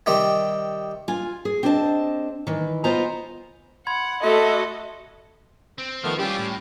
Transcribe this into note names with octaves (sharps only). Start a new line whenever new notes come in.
C3 D#3 G3 G4
F4 G#5
G#4
C4 D4 C5 D#5 A5
D#3 E3
B3 F4 C5 D#5 G#5 A#5
F#5 B5 C6 G#6
A3 F#4 A4 D#5 E5 C6
C4
D#3 F3 A3 B3 F6
G3 C#4 E4 F4 G4 D6
A2